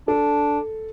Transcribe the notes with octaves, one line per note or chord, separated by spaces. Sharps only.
D4 A4